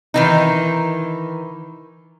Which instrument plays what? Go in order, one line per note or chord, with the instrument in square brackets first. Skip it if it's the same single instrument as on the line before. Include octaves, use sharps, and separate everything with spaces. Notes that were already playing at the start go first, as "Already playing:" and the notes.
[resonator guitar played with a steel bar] D#3 E3 D#4